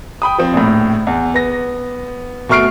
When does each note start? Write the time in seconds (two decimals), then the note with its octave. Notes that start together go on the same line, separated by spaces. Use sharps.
0.22 G5 B5 D#6
0.38 F3 C4
0.54 A#1 A2
1.07 E2
1.34 B3 A#6
2.49 B2 A3 C#6 F6 C7 D7